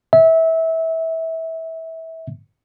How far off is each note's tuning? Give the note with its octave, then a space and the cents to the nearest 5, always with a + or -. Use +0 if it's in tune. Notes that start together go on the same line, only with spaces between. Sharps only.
E5 -20